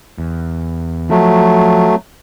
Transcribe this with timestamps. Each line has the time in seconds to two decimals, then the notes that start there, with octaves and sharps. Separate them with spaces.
0.18 E2
1.10 F3 F#3 A3